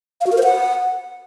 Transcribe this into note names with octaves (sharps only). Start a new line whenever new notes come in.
F5
F#4
A#4
C5
F#5